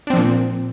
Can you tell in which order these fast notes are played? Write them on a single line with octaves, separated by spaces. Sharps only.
D4 C4 F3 A#2